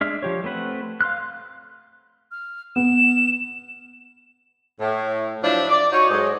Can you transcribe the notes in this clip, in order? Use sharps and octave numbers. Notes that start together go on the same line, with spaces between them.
G#3 D4 E5 F6
F3 G4 C#5
A3 C4 B4 F#5
F5 C6 F6 F#6
F6
B3 E7
A2
F3 F#3 D4 E4
D5
D#4 F#4 C#5
G#2 F#3 G#3 A4 D#5